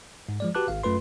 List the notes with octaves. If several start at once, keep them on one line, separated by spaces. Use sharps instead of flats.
G#2
F3 G#3 D5
F#4 G4 B4 A5 D6 F#6
G#1 G#2 F5
F#2 A3 F4 B4 C6